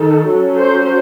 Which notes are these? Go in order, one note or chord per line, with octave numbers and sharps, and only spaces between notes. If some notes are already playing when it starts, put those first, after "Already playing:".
Already playing: D#3 A4
F#3 C#4
C5